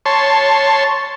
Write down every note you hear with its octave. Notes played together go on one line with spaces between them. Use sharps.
C#5 A5 C6